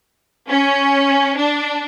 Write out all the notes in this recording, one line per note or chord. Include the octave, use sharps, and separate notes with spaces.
C#4
D4